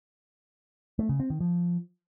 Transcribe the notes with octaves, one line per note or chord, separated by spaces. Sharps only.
A3
C#3
C4
D#3
F3